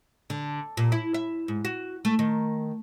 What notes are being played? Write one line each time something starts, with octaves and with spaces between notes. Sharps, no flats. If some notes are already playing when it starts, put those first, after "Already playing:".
D3
A#2
E4
E5
G#2
F#4
A3
D#3